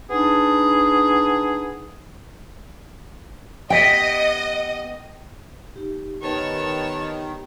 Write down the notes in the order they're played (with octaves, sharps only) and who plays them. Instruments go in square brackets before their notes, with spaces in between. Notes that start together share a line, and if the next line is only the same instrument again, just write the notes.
[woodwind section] B3 D4 D#4 G#4
[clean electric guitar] B3 G4 E5 [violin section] D#5 [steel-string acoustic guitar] G5
[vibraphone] D#4 G4
[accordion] D#3 [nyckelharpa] B3 [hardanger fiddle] C#5 A5